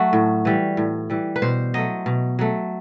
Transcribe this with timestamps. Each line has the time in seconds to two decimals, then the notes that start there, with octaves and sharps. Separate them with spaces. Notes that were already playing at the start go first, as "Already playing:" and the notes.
Already playing: F#3 A3 F#4
0.13 A2
0.45 E3 G3
0.77 A2
1.10 E3 G3
1.36 B4
1.42 B2 C5
1.74 F#3 A3 D#5
2.06 B2
2.39 F#3 A3